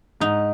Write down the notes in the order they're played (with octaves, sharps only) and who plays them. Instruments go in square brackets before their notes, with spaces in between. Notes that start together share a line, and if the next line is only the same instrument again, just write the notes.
[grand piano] G#2 [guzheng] D#4